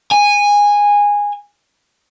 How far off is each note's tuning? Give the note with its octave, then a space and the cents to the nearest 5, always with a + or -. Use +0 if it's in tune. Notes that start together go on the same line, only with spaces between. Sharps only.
G#5 -15